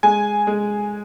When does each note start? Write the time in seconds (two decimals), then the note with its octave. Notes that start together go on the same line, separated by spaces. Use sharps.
0.03 G#3 G#5
0.47 G#3